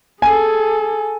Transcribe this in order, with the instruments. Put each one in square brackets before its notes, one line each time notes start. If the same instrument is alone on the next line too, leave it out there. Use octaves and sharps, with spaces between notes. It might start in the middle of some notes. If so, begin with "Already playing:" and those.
[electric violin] G#4 A4 [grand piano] G#5